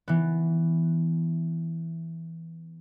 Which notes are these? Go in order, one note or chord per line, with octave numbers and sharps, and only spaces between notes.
E3 B3